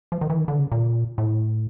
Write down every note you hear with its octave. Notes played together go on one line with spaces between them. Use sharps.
F3
D#3
E3
D#3
D3
C#3
A#2
A2